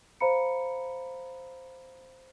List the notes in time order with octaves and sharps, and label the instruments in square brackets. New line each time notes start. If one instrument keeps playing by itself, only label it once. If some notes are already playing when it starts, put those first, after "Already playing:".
[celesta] C5 F5 A#5 B5 C#7